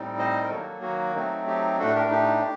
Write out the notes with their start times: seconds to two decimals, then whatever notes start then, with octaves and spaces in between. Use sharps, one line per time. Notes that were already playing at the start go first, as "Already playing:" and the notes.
Already playing: A2 G3 C4 D#4
0.19 C5 D#5
0.43 A#4
0.50 D#3 F#3 A#3 F#4 A4
0.82 F#4
1.15 F#3 A3 C4 D#4
1.47 D#4 G4
1.79 A2 A3 D4 F#4 A4
1.95 G4 A#4
2.11 D#4 G4